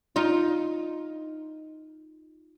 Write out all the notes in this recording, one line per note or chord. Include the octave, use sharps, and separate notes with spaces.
D#4 F4